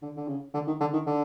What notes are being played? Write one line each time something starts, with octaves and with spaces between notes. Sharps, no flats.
D3
D3
C#3
D3
D#3
D3
D#3
D3